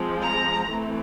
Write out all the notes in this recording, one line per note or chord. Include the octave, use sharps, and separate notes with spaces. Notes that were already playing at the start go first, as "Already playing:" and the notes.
Already playing: F3 G#3 C4
A#5
E3 A3 C4